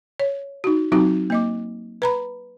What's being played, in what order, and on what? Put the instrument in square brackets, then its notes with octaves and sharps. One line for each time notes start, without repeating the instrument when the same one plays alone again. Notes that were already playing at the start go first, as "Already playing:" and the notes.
[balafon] C#5
D#4 F#4
F#3 C4 D#4 F4 F#4
A#3 D#5 D6
B4 A#5 B5